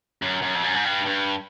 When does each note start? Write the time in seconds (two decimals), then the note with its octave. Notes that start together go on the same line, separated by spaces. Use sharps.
0.22 F#2
0.42 F#2
0.54 F2
0.64 F#2
0.74 G#2
0.84 G2
1.05 G2